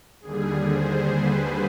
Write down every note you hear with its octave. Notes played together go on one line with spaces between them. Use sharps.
D#2 D3 G3 G#4
C5
B4